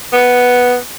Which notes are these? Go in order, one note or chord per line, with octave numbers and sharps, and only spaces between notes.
B3